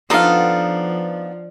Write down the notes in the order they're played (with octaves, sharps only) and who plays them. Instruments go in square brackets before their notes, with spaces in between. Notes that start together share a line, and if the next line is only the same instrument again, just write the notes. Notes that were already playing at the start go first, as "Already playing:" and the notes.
[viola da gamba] F3 [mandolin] B3 D#4 F4 [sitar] D4 [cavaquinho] A4 F5